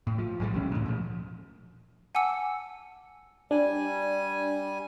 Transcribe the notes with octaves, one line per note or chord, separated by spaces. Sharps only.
A2
F3
B1 A2 F#3 G3
C#2 B2 E3 C#4
D2 A2
A#2 F3
F#5 G#5 A5 D6 E6 C#7
G3 D4 G#5